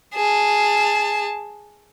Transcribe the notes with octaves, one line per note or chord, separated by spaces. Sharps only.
G#4 A5